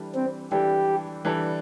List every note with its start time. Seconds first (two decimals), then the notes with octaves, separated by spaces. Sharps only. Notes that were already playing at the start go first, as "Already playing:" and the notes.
Already playing: E3 G3 D4 A4
0.15 C4
0.52 E3 G3 D4 G4 A4
1.25 E3 G3 D4 A4